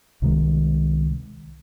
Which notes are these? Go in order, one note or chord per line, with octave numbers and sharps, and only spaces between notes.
C2 C3 D#3 G#3